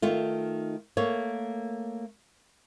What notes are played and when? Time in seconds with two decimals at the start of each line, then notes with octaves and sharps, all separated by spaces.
0.02 D#3 A3 F4
0.97 A3 A#3 C#5